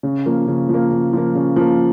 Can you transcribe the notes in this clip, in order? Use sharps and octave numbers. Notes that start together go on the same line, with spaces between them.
C#3
F3 A#3
C#3
F3
A#3
C#3
F3 A#3
C#3
F3 A#3